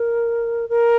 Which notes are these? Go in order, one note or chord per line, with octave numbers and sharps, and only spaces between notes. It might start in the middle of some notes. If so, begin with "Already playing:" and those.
Already playing: A#4
A#4